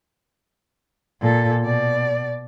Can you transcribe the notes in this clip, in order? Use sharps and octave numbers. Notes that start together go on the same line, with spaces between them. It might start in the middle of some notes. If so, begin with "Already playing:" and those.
A#2 A4
B2 D5